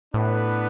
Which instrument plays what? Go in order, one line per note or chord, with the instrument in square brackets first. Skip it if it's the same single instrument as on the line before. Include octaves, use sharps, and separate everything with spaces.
[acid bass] A2 [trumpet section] B3 D4 B4